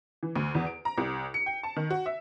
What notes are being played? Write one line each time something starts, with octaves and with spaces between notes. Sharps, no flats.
E3
D2
E2
D7
A#5
C2
C#7
G5
A5
D#3
F#4
E5